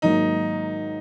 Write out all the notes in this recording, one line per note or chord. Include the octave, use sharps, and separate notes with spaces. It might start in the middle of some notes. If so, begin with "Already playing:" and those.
G#2 D#3 F#3 A#3 D#4